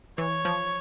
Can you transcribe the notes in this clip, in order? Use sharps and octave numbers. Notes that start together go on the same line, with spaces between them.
E3 C#5
F3